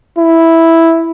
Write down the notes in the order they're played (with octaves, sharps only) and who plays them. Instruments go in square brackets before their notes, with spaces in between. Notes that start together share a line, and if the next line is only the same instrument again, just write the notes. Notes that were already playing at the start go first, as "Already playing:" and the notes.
[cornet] E4